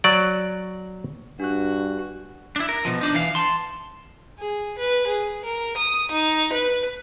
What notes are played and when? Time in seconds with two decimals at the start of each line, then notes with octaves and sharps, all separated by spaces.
0.04 F#3 D5
1.40 G2 D4 F#4 F#6
2.56 D4 E4
2.69 A#4
2.85 B2 F3
3.01 D4 D#4
3.14 E3 F5
3.35 A5 C6
4.38 G#4
4.78 B4
5.07 G#4
5.44 A#4
5.77 D#6
6.11 D#4
6.53 B4